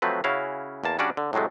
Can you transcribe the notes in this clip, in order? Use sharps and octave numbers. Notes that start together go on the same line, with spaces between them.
F3 F#3 A3 C4 B4
C#3 C#4 E4 F#4 F5
E2 A#3 A5
C#3 G3 C#4 D4 F#4 D5
D3
A2 C3 F#3 G#3 A3